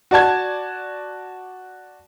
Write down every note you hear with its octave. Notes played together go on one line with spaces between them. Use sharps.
F#4 D5 A5 G#6